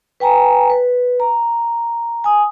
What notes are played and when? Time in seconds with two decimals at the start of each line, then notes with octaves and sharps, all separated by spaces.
0.20 B4 G5 G#5 A#5
0.70 B4
1.20 A#5
2.24 G#5 D#6